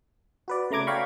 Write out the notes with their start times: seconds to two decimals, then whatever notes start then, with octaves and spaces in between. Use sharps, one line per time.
0.48 F#4 B4 D5
0.71 C#3 A3 A#5 D6 G#6
0.87 C#5 D5 F5 G5 B5 C#6